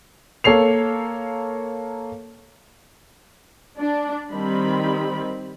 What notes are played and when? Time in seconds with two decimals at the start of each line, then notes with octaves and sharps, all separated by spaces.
0.44 A#3 A4 C#5 C7 F7
3.79 D4
4.32 D#3 G3 C4 B5